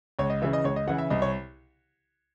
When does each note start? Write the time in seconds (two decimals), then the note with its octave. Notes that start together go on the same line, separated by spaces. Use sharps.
0.19 C#2 C#5
0.30 D#5
0.42 C#3 E3 E5
0.53 D#5
0.64 C#2 C#5
0.76 D#5
0.87 C#3 E3 F#5
0.98 E5
1.10 C2 D#5
1.22 C#5